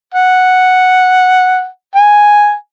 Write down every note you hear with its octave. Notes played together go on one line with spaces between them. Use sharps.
F#5
G#5